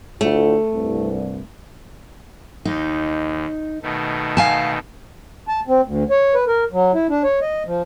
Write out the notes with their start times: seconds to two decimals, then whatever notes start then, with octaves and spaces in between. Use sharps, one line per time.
0.21 D2 A2 A3 F4
0.72 C2 G2
2.65 D#2 D#4
3.82 B2 D#3 A3
4.37 F5 G#5 A5
5.48 A5
5.68 C4
5.85 D2
6.10 C#5
6.35 B4
6.47 A#4
6.73 F#3
6.94 E4
7.10 D4
7.23 C#5
7.41 D#5
7.66 F3